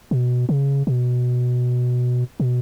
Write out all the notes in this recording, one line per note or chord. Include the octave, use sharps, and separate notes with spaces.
B2
C#3
B2
B2